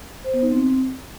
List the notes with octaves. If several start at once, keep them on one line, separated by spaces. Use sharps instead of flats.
C5
B3
D#4
C4